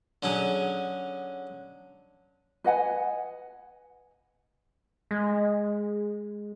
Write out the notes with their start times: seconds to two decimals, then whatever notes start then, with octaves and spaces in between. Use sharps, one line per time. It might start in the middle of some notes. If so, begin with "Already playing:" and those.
0.23 D3 F#3 C#4 G#4
2.64 B4 D#5 F#5 G#5
5.11 G#3